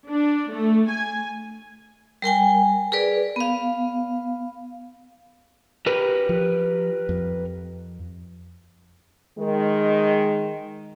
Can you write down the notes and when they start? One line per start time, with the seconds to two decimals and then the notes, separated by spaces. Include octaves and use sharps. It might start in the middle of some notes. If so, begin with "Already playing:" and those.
0.11 D4
0.51 A3
0.91 G#5
2.22 G3 A#4 G5 G#5
2.92 G#4 A#4 B4 D5
3.36 B3 F5
5.86 G4 A#4 B4
6.29 F3
7.09 F2
9.39 D#3 G#3